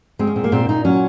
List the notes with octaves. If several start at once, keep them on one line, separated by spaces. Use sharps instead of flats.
G#3 C4
C#4
A#2 C4
A#3
A#2 C4
A#2 D#4
F#3 C#4